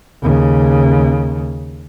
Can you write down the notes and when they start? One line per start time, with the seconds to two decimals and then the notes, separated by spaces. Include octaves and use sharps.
0.22 D#2 C#3